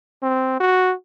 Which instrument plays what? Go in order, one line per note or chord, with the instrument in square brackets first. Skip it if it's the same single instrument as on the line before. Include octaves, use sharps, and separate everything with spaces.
[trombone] C4
F#4